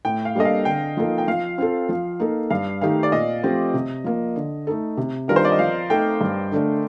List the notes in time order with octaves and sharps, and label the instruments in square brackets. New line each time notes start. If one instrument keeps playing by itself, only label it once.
[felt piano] A2 [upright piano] G5
[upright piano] F5
[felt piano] G3 A#3 D4 A4 [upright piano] D#5
[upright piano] F5
[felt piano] D3 [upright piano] G5
[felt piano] F3 A#3 D#4 A4
[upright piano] G5
[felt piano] F3 [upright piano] F5
[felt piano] C4 F4 A4
F3
A#3 D#4 A4
[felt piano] G2 [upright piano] F5
[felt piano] D#3 A3 D#4 G4 [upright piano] F5
[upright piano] D5
[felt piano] A#2 [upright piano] D#5
[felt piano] F3 A3 C4 G4
C3
F3 A#3
D3
A3 D#4 A4
C3
[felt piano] D#3 G3 D4 F4 [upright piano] A#4
[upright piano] C5
D5
D#5
[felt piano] F3 [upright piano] F5
[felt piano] A3 D#4 A4 [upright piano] G5
[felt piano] G2
D3 A3 D4